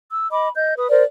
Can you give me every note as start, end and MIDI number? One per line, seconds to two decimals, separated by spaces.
0.11 0.30 88
0.32 0.49 75
0.32 0.49 83
0.32 0.49 86
0.55 0.74 75
0.55 0.74 91
0.78 0.89 71
0.78 0.89 87
0.90 1.02 70
0.90 1.02 72
0.90 1.02 74